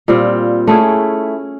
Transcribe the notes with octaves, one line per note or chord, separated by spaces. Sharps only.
A#2 G3 C4 F4
A3 C#4 E4 G#4